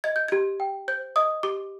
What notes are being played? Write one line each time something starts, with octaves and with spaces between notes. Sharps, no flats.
D#5 G#6
G6
G4 G#6
G5
C5 G6
D#5 D#6
G4 D6